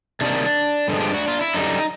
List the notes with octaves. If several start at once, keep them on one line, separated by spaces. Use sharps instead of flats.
C3 D#3 G3 A#3 D4
G2 D3 F3 G#3
G4
F#4
F4
E4
F#2 D3 G3 D#4